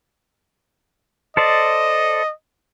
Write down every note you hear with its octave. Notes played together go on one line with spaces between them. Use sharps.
A4 C5 D5 D#5